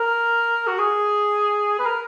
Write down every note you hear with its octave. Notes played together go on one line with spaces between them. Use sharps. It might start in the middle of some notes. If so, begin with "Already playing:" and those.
Already playing: A#4
F#4
G#4
B4
A#4